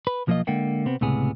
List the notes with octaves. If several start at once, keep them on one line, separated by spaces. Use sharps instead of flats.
B4
B1 F3 A#3 C#4 F4 D#5
D3 G#3 A#3 F#5 G5
C3 B3 C4
C#2 A2 C3 B3 G#4